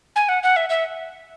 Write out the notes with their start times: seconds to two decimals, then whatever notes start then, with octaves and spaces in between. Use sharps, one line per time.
0.16 G#5
0.29 F#5
0.43 F#5
0.56 E5
0.69 E5